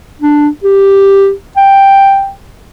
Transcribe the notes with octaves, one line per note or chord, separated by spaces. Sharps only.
D4
G4
G5